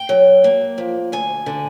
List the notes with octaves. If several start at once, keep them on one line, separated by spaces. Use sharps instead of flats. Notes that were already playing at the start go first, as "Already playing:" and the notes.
Already playing: G5
F#3
A#3
F3
D2 G#5
D3